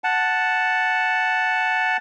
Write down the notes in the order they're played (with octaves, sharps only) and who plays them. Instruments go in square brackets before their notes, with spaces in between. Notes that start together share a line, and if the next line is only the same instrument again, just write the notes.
[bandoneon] F#5 A5